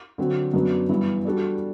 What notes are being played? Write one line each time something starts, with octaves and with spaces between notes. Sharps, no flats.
D3 F#3 C4 F#4
F#2 F#3 B3 D4 F#4
G2 E3 B3 E4
G3 D4 F#4 A4 D5